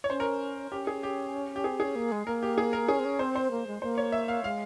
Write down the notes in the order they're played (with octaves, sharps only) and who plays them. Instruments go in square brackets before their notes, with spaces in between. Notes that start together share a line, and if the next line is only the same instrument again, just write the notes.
[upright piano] C#5
[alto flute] C#4 [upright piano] C5
[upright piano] A#4
[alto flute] C#4 [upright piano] G4
[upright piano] G#4
G4
G4
[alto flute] C4 [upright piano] G#4
[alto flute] C#4 [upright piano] G#4
[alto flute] A#3
G#3
[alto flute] A#3 [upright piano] A#4
[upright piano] G4
G#4
A#4
[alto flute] C#4 [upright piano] G#4
[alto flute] C4
C#4
[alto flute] C4 [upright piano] C5
[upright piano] C5
[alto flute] A#3
G#3
[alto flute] A#3 [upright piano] C5
[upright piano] C#5
E5
F5
[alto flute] G#3 [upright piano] F5